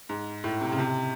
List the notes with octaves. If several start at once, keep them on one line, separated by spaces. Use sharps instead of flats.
G#2
A2
C3
C#3
C3